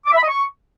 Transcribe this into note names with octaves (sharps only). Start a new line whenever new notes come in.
D6
E5
B5
D#5
C#6